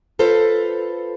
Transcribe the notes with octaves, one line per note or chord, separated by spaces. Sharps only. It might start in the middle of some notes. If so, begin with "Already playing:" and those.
F4 A4 B4 C5